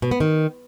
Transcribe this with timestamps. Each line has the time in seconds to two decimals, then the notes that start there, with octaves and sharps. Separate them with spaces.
0.02 B2
0.11 B3
0.20 D#3